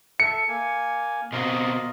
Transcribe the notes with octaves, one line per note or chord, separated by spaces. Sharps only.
A4 E5 C#7
A#3 G#5
B2 C4 F4 A#4 D#5